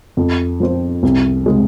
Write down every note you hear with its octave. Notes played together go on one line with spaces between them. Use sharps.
F2
F3 C4 F4 C5
C2
C3 G#3